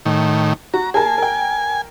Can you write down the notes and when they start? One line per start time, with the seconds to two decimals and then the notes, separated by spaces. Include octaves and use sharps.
0.06 A2 D#3
0.74 F#4 A#5
0.94 G#4 A#4 G#5 A5
1.18 A#4 G5